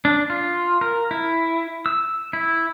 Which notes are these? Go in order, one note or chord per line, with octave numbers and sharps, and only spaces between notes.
D4
F4
A#4
E4
E6
E4